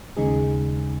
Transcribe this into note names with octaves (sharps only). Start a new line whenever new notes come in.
D#2 C#3 G#3 D#4 G#4